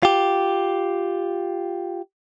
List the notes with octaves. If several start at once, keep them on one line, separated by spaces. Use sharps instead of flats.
F4 G4